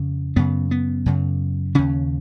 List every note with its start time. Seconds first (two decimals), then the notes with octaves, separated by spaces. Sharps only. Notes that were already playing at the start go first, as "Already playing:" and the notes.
Already playing: F2 C#3
0.36 F#2 C#3 B3
0.71 B3
1.06 F#2 C#3
1.75 D#2 C#3 C#4